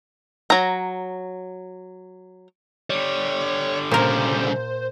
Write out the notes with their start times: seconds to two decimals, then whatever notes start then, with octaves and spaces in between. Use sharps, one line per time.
0.50 F#3 A#5
2.90 D3 G3 C#5
3.91 C2 A#2 C#3 A#4 C5